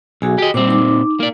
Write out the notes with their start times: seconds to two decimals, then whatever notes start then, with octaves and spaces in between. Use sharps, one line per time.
0.22 B1 F#4 G#4 G#5
0.38 G4 D#5
0.54 A#2 G3 C4 C5 D6
0.68 D#4 D6
1.20 A#3 D5